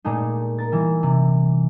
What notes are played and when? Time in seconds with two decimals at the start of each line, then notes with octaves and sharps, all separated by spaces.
0.05 A#2 G#3 A3 D#4
0.58 A#4 A6
0.72 E3 G3
1.03 C3